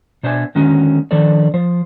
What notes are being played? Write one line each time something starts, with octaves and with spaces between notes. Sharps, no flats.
B2 D4 C5 D5 E5 G#5
D3 D#3 G#3 C#4 D#4 F#4
D#3 F3 D4 A4 D5
F3 C5